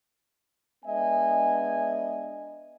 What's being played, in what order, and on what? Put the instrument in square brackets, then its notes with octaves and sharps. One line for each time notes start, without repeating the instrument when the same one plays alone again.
[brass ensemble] G#3 B3 D4 D#5 E5 G#5